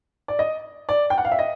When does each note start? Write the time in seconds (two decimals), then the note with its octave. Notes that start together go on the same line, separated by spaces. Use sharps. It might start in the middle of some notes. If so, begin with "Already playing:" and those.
0.28 D5
0.39 D#5
0.89 D5
1.10 G5
1.18 F#5
1.25 F5
1.32 E5
1.39 D#5